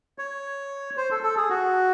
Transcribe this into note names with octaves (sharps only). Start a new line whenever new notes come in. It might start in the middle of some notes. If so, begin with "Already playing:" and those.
C#5
C5
A4
A4
G#4
F#4